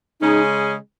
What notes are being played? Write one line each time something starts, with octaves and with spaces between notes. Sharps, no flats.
C#3 G#3 C#4 D#4 G#4